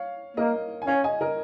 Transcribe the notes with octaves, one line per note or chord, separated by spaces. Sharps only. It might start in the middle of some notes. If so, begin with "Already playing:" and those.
Already playing: C#5 F5
A#3 A#4 D#5
G#5
C#4 C#5 F5
D#5 G#5
A#4 D#5